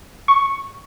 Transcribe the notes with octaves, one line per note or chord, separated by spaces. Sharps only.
C#6